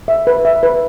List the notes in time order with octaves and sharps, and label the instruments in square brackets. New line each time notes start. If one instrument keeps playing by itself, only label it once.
[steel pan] E5
B4
E5
B4